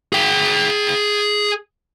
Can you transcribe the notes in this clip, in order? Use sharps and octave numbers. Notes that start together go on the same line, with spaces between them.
G#4 G5